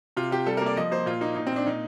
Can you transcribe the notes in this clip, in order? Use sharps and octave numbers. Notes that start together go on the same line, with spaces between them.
C3 F4
C3 G4
G3 A4
A#3 A#4
D5
F3 D#5
A#3 C5
A#2 F4
A#3 D#4
A#2 D#4
C4
A#2 D4
A#2 D#4